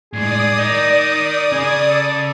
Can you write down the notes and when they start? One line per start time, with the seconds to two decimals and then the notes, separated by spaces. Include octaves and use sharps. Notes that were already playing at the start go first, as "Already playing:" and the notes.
0.13 A2 G#3 G#4 D5 D#6
0.58 D#4 A#4 D#5
1.52 C#4 G#4 G#5
1.88 A4